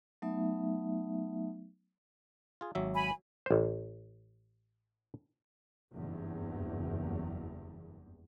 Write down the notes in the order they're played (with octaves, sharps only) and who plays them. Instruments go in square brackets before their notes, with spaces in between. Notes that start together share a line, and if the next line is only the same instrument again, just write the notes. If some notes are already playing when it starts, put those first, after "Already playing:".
[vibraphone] F#3 A3 B3 D#4 E5
[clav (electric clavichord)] F4 G#4
G#1 F#3 E5
[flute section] G#5 B5
[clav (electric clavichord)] A1 C5
[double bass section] F#1 E2 G2